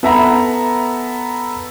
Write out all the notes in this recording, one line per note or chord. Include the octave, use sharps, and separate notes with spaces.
B3 A4 E5 F#5 A#5 B5